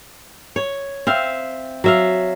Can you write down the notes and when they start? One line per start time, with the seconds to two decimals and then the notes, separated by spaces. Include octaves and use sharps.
0.56 C#5
1.07 C4 E5 F5
1.84 F#3 E5 F5